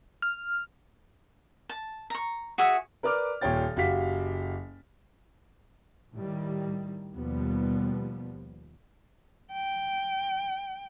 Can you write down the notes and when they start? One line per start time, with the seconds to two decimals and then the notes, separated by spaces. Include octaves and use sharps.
0.22 F6
1.70 A5
2.10 A#5 C#6
2.58 F#4 G#4 C#5 E5
3.03 A#4 B4 D5 D6 F6
3.41 D#1 A#2 C#5 G5 A6
3.76 F#1 F#4 G4 F5 B6
6.13 A2 D#3 G3
7.13 D#2 B2 F3 G3 B3
9.53 G5